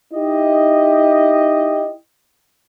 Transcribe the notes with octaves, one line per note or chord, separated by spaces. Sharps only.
D#4 E4 G4 D#5